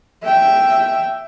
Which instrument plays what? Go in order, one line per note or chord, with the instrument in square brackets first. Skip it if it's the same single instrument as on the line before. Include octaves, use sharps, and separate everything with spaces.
[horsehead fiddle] E5 G5